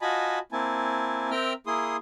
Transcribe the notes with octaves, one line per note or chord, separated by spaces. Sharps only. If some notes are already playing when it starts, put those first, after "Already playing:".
F4 F#4 D#5 G#5 A5 B5
A#3 C4 E4 G#5 A5
C4 A#4 E5 G5 A#5 F6
A#3 E4 G#4 C6 D#6